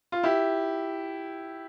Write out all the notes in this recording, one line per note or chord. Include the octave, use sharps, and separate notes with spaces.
F4
E4 G4